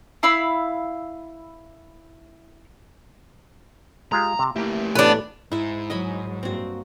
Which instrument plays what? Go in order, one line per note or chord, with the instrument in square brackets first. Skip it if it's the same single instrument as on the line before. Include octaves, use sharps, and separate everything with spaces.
[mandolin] E4 F5 B5 E6
[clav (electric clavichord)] G#3 F4 G4 [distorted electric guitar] A#5
[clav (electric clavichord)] C3
[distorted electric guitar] A3 G4 [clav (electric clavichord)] A#3 E4
[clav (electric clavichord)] A1 [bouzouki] B3 D4
[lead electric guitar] G#2 [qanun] E4 E5
[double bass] F#3 [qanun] D#5 G#5 B5
[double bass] G2 A#3 [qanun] C4 F#4